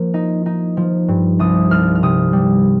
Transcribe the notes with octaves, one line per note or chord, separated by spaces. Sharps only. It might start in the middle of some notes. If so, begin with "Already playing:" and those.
Already playing: F3 A#3
D#4
D#4
F3
G2
C2 D#6
C2 F6
F6
C3 D#6
G3